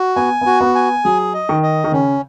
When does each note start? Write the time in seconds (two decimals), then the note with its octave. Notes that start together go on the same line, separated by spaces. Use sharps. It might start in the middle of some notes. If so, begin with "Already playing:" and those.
Already playing: F#4
0.16 B3 G#5
0.41 B3 F#4
0.61 B3
0.75 G#5
1.05 F#3 G#4
1.34 D#5
1.49 D#3
1.63 D#5
1.84 D#3
1.92 C#3 C#4